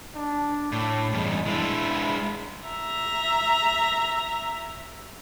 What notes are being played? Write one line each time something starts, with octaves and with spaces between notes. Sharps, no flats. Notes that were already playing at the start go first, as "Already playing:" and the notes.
D4
A2 D4
E2 G2 G#3
G#3 D4 E4
E5 A#5